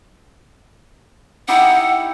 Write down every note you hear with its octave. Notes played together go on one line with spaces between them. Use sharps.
D#4 E4 G4 F#5